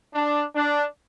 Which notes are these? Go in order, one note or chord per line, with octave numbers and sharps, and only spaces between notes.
D4
D4